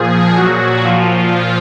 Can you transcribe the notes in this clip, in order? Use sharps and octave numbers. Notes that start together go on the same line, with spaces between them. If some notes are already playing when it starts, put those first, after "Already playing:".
Already playing: A#2 F3 G#4
A#2 F#3 F#4
A#2 F3 F4